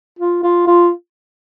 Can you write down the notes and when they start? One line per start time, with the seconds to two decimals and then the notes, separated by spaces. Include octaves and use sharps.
0.19 F4
0.43 F4
0.67 F4